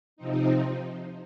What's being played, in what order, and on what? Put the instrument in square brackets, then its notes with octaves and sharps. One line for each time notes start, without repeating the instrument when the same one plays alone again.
[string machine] C3 F3 C4 D#4